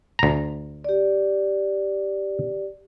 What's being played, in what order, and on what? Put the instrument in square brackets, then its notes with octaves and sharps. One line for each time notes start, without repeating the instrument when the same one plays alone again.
[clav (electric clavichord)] D2 A#5
[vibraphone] G4 D5